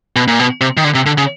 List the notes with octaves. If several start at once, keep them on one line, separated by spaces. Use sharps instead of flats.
B2
A#2
B2
C3
D#3
D3
C3
D3
C#3